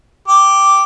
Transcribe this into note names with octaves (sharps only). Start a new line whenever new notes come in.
G4